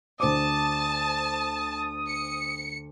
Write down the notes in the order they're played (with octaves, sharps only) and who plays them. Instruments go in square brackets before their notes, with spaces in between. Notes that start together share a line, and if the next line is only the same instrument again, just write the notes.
[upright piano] D2 C5 D6 [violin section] A5 [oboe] D#6
[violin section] C#7